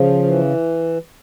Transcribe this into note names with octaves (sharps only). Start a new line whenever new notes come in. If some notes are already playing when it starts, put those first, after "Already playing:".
Already playing: C#3 F3
E3